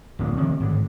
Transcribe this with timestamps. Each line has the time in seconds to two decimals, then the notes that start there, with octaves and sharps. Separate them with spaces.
0.19 D1 A#1 A#3
0.37 C3 D#3 A#3
0.60 G#1 A2 D3